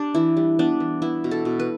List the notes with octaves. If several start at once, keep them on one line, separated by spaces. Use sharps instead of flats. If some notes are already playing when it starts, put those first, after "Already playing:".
Already playing: D4 G4
E3 E4
G3
B3 D4
E3
B3 E4
B2
A4
B2
B4